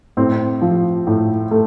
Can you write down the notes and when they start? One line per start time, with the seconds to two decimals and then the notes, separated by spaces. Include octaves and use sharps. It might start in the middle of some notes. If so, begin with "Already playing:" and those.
0.17 A2 C4
0.62 F3
1.07 A2
1.51 A3